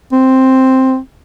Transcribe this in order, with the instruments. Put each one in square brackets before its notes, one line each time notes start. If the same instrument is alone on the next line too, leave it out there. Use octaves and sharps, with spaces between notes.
[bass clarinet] C4